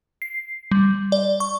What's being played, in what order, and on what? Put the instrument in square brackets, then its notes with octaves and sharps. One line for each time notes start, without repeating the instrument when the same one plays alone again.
[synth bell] C7
G3
D5
C#6